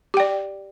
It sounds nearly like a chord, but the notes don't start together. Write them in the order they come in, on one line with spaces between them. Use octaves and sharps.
G4 G5 D5